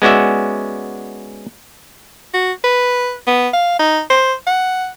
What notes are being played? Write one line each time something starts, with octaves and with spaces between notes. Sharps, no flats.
G#3 B3 C#4 F#4 D5 E5
F#4
B4
B3
F5
D#4
C5
F#5